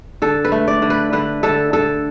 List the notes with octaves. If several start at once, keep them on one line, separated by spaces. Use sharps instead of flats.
D3 A4
B4
A3
D5
D3
B4
D3 B4
D3 A4
D3 A4